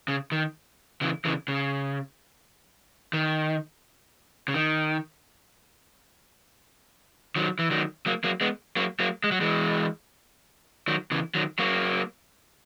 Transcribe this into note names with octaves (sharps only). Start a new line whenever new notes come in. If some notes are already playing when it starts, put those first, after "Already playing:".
C#3
D#3
C#3 E3
C#3 E3
C#3
D#3
C#3
D#3
D#3 F#3
E3
D#3 F#3
F#3 A#3
F#3 A#3
G#3 B3
F#3 A#3
F#3 A#3
G#3
F#3
E3 G#3
D#3 F#3
C#3 E3
D#3 F#3
F#3 A#3